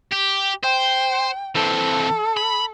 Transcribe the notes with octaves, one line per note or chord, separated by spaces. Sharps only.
G4
C5 G5
E3 C4 A4
B5